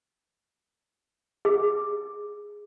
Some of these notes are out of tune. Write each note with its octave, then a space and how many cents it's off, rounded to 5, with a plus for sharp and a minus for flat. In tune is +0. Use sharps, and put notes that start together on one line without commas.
G#4 -5